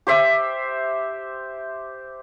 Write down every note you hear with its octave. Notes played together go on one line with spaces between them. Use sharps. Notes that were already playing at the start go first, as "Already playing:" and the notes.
G4 C5 E5